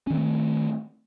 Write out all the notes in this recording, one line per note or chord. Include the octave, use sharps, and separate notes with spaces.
D#3 A3 C4 C#4